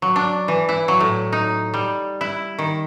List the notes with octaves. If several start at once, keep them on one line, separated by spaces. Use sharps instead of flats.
F#3
D4
E3
E4
F#3
A2
D#4
G3
E4
D#3